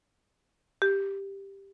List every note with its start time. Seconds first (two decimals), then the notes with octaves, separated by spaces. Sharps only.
0.82 G4